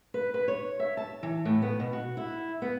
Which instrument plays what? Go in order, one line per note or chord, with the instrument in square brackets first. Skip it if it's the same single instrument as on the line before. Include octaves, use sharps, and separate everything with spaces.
[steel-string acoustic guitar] B4
B4
C#5
E5
A5
E3
A2
B3
B2
F#4
E4
B3